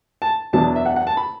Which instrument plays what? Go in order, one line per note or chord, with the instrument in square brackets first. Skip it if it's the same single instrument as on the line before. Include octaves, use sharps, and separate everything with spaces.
[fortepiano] A5
E2 B2 F#3 D4 A5
E5
F#5
F#5
A5
B5